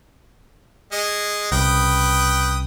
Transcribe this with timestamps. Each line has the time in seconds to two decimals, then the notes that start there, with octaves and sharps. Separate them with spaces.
0.92 G#3 D#5
1.52 C2 C#3 B4 G5 D#6